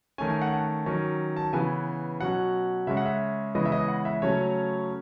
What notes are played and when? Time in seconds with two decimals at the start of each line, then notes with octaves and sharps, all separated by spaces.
0.18 D#3 A3 C#4 G#5
0.30 G#5
0.42 F#5
0.53 A5
0.86 D#3 F#3 C#4
1.36 A5
1.53 C#3 E3 B3 G#5
2.20 B2 F#3 C#4 F#5
2.87 C#3 G#3 C#4 E5
2.97 F#5
3.06 E5
3.55 C#3 E3 G#3 B3 D#5
3.65 E5
3.72 D#5
3.88 F#5
4.05 E5
4.22 C#3 F#3 A3 C#4 C#5